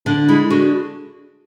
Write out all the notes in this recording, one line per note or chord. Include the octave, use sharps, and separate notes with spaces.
D3 D4
G#3 E4
D3 F#4